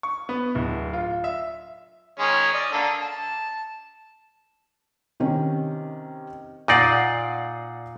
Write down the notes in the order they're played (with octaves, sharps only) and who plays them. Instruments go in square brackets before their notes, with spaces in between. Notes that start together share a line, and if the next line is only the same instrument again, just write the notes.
[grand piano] C#6
B3
D1
F4
E5
[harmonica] D#3 G#3 C#4
D5 D#5
D3 A#3 A4
A5
[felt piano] C3 D#3 C#4
[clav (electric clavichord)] A#2 D#4 D5 [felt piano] F#5 C7 D#7